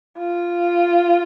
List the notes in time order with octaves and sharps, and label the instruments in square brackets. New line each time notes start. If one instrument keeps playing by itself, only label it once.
[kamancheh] F4